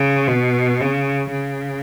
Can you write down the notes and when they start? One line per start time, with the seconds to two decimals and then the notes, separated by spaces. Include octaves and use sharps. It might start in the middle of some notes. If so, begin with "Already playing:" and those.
Already playing: C#3
0.28 B2
0.81 C#3
1.31 C#3